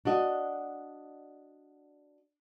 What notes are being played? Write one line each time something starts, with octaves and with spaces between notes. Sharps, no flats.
D4 F#4 D#5